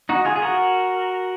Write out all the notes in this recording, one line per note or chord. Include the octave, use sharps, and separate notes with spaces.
D#4 F#4
F4 G#4
G#4
F#4 A#4